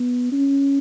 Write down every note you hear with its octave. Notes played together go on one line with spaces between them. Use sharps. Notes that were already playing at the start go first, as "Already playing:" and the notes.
Already playing: B3
C#4